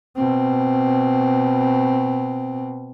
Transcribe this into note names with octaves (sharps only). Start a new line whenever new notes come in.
B2 C4